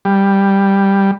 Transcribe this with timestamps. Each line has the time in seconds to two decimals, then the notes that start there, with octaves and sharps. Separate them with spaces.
0.05 G3